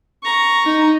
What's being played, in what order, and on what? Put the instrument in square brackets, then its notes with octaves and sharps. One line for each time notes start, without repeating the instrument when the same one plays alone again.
[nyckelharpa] A#5 C#6
[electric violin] D#4